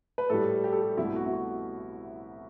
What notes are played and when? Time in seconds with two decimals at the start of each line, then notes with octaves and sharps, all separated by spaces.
0.18 B4
0.30 A2 G3 A4
0.64 G4
0.72 A4
0.82 G4
0.97 C2 B2 A3 E4
1.16 F#4
1.26 E4
1.33 F#4